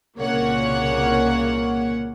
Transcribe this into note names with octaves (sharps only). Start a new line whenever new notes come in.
C2 A#2 C#3 A#3 C#5 F#5